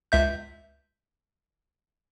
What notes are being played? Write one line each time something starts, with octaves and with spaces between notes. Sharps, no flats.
C#2 E5 G6